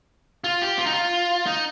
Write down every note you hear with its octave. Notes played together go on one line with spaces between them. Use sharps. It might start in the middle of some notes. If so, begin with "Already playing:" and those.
F4
G4
F4
D#4
F4
D#4